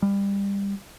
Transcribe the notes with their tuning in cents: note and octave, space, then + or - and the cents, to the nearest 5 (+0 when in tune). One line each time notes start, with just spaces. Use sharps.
G3 +25